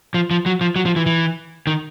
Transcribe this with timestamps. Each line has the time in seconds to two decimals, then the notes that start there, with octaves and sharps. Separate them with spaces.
0.14 F3
0.31 F3
0.46 F#3
0.61 F3
0.76 F#3
0.86 F3
0.96 E3
1.06 E3
1.67 D#3